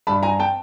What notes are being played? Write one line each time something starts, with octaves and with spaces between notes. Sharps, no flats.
G2 A5 B5
G#5 A#5
G5 A5